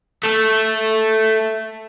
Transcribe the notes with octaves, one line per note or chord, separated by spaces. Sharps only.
A3 A4